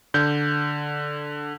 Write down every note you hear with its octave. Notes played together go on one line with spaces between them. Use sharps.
D3 G6